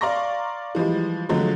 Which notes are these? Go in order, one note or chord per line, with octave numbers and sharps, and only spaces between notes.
D5 F5 A#5 C6 C#6 A#6
E3 F3 G3 G#3
D3 F3 F#3 G#3 A3